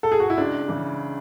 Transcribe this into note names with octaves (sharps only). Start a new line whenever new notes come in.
A4
G#4
F#4
E4
C#2 D4
C#3 E3